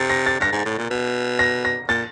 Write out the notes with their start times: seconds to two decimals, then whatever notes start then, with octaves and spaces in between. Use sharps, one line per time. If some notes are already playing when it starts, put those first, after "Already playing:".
Already playing: C3 A6
0.10 A#6
0.26 A6
0.40 G2 A#6
0.52 G#2
0.65 A2
0.78 A#2
0.90 B2
1.39 A#6
1.65 A#6
1.88 A#2 A6